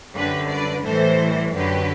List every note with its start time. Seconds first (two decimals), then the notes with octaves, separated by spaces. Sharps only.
0.14 F#2 D3 G3 G4 B4
0.50 B4 D5
0.85 A2 E3 G3 A4 C5
1.55 F#2 D3 F#3 G4 B4